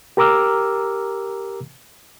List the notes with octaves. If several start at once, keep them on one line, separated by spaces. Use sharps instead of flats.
G4 A#4 A#5 D6 E6 F6